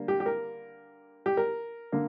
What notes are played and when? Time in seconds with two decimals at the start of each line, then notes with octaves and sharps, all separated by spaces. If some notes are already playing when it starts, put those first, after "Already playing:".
Already playing: D3 G3 A#3
0.08 G4
0.20 G4
0.26 A#4
1.26 G4
1.37 A#4
1.92 D3 A#3